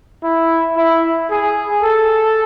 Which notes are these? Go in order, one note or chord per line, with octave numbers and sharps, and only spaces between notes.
E4
E4
G#4
A4